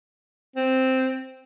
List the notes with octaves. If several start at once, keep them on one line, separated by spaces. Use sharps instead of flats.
C4